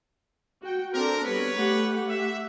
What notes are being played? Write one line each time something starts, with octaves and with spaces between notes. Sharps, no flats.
F#4 G5
C4 D4 A4 A#4
G3 B3 B4 C#5
A3 G4 F#5
E5